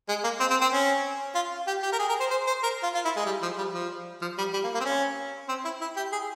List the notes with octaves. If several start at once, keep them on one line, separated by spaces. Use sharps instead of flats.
G#3
A#3
C4
C4
C4
C#4
F4
G4
G4
A#4
G#4
A#4
C5
C5
C5
A#4
F4
F4
E4
G#3
G3
F3
G3
F3
F3
G3
G3
A#3
A#3
C4
C#4
C4
E4
E4
G4
G#4